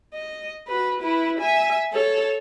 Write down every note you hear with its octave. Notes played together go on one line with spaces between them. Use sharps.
D#5
F#4 B4
E4 B4
E5 G#5
A4 C#5